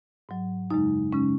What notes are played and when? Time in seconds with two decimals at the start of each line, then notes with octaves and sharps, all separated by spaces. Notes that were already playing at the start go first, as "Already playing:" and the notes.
0.29 G#2 F#3
0.70 F#2 C#3 G#3 D#4
1.12 C#3 G#3 C#4